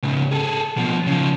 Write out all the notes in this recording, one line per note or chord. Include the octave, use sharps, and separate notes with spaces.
C#2 G#2
G#4 A4
B2 F3
C#3 F3